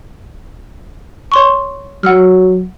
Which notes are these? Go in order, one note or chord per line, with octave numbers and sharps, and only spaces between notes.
C#5 C6 C#6
F#3 F#5 E6 F6